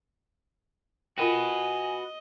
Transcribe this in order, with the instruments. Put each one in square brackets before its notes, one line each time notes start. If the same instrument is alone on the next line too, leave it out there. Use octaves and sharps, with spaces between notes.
[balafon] F4 A#4 G5 [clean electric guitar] F#4 B4 [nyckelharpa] D#5 [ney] G#5